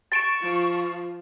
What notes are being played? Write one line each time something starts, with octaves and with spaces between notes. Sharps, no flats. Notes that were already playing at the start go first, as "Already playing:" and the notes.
C#6 A6 D7 E7
F3